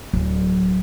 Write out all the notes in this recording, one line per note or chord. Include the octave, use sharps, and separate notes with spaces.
D1 F#3